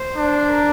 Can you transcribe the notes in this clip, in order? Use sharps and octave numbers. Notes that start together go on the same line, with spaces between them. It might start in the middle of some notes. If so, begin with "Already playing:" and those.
Already playing: C5
D4
A#4